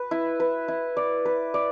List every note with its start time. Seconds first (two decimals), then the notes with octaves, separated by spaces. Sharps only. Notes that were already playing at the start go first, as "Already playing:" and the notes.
Already playing: B4
0.11 E4
0.40 B4
0.68 E4
0.97 D5
1.25 B4
1.54 D5